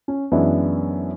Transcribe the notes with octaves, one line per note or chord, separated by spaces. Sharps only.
C#4
F#2 E3 G#3 B3 D4 E4